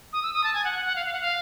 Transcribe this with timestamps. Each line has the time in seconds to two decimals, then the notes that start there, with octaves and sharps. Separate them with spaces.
0.13 D#6
0.23 E6
0.33 D#6
0.44 A5
0.54 G#5
0.64 F#5
0.75 F#5
0.85 F#5
0.96 F5
1.06 F5
1.13 F#5
1.21 F5